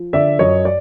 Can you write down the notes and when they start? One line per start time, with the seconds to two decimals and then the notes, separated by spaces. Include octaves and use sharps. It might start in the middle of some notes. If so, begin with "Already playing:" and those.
Already playing: F3
0.13 D3 D5 E5
0.39 F#2 C#5 D#5
0.65 D5